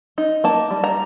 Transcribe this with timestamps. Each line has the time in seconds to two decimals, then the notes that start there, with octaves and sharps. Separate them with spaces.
0.18 D#4
0.44 A#3 A5
0.70 G3
0.84 A#5